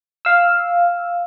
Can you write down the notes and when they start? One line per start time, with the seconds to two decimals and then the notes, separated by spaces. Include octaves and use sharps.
0.25 F5 E6